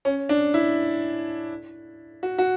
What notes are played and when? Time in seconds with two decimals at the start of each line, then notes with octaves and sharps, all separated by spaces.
0.05 C#4
0.29 D4
0.54 E4
2.23 F#4
2.38 F#4